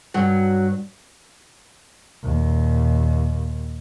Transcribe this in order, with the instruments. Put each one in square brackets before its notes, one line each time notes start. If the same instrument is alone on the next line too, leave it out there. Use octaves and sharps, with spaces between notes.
[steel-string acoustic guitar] G2 [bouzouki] F#3
[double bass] D#2 A#2